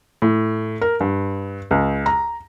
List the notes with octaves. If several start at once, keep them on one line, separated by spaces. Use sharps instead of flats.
A2
A#4
G2
C#2
A#5